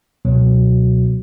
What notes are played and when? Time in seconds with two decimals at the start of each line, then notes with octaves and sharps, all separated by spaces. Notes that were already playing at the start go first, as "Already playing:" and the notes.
0.25 C#2 B2 F#3